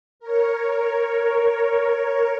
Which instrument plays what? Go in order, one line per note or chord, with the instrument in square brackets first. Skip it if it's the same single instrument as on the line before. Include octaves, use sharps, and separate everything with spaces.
[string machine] A#4 C#5